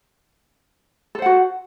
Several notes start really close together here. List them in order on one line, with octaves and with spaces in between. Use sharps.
A4 C5 F#5 F#4